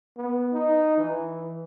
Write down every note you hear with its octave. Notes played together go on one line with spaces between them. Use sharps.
B3
D#4
E3